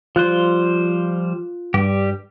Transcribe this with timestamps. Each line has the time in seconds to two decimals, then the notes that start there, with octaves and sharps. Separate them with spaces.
0.16 F3 G3 F4 C5 F#6
1.74 G2 G3 G4